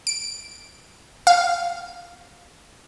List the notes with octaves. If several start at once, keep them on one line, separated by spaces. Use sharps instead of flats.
D7
F5